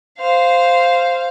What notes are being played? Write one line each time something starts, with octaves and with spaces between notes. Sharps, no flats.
C5 F5